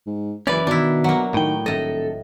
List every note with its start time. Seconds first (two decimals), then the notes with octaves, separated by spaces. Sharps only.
0.07 G#2
0.47 F#1 E3 C#4 B4 D5
0.67 B2 D#3 D4 E4
1.04 F#3 A#3
1.34 A2 D#3 G5
1.66 D#1 A2 A4 D#5